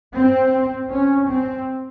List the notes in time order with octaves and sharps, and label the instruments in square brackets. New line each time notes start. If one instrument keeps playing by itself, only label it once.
[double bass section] C4
C#4
C4